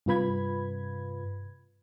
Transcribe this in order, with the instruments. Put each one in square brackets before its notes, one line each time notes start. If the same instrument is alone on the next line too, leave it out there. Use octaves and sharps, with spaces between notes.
[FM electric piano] G2 C3 F4 B4 B5 G#6